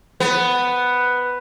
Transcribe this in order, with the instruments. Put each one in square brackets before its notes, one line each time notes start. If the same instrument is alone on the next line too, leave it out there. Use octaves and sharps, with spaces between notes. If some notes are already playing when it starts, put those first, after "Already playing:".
[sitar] B3